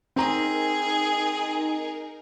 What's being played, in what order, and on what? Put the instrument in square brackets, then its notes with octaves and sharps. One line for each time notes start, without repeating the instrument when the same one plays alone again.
[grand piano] C4 A#5 [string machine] D#4 A#4 [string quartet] G#4